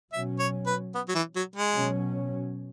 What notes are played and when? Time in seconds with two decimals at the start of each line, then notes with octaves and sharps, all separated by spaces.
0.12 B2 F#3 C#4 E5
0.39 C#5
0.66 B4
0.95 B3
1.08 F#3
1.15 E3
1.36 F#3
1.56 G#3
1.76 B2 F#3 C#4